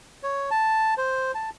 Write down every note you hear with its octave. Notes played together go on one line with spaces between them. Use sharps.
C#5
A5
C5
A5